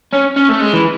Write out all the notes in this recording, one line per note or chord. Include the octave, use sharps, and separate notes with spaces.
C#4
C#4
A3
G#3
E3